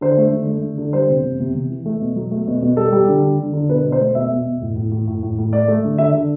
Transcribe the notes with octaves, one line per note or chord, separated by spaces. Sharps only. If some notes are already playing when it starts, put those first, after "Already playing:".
D3 C5
A3
D3
A3
D3
D3
G3 C5
C3
C3
C3
C3
E3
A3
B2
F#3
A3
B2
B2
G3 A4
G3
D3
D3
D3
D3
B2 B4
B2
C5
A3
B2 E5
B2
B2
A2
A2
A2
A2
A2
A2
A3 D5
A3
D3
D3 E5
D3